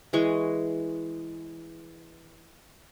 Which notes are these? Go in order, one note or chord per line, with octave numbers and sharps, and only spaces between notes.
E3 G#3 C#6